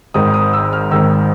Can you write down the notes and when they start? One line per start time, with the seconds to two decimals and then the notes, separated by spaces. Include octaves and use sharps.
0.14 G#1 G#2 D#3 D#6
0.34 D#6
0.53 E6
0.73 F6
0.91 G#1 G#2 D#3 E6